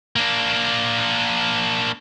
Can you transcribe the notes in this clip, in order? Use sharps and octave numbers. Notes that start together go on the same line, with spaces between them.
A#3 D4